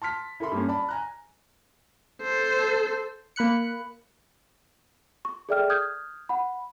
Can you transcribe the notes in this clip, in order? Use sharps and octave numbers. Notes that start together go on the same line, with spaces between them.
A5 C6 F6 B6
E4 A4 A#4 E5 B5 C6
G2 A#3 C#4
D5 A5 B5
G#5 A#5 F#6
A4 C5
A#3 B5 F#6 C#7
C#6
G#4 A4 D5 E5 G5 F6
D#6 F6 G6 G#6
F#5 B5